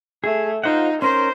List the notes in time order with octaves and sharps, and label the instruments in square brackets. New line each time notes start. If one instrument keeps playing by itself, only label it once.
[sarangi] A3 [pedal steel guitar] G#4
[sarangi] D#4 [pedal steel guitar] F4 C5 F#5
[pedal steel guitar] C#4 A#4 [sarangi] C5 [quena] C6